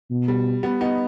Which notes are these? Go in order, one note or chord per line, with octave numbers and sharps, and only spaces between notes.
B2
G3
G3 B3
B3 D#4